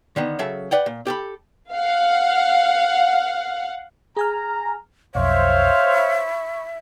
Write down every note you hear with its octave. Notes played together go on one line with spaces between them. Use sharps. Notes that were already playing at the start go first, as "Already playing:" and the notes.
D3 D#3 B3
C#3 F#3 A4 E5 A5
B4 D5 F#5 G5
A#2
G4 A4 B5
F5 F#5
G#4 G#5 A#5 F6
B1 F2 C5 C#5 E5 F5
B5 C#6